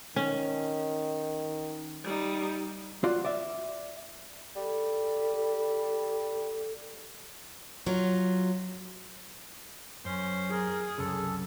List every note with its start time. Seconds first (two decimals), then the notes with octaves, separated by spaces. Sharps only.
0.16 D#3 C#4
2.04 G3 D#4
3.04 F4 F#4 D5
3.25 D5 E5
4.56 G3 A4
7.86 F#3 F4
10.05 F#2 C#4 C5 C6
10.51 G#4 A#4
10.98 C2 F#2 C#3 A4